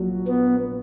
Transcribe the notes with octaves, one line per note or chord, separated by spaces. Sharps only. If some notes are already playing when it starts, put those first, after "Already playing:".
Already playing: A#1 A#2 F#3 F#4
B3